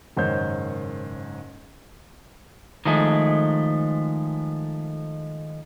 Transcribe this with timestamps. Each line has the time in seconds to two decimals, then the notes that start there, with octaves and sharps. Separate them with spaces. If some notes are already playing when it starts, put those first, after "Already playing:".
0.17 F#1 G#2 D#3 C5 C#5 G6
2.85 D#3 F3 G#3 A3